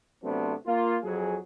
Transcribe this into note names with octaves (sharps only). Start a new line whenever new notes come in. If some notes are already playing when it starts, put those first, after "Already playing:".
C3 F#3 A3 B3 C4 D4
A#3 F4
F2 F#3 G#4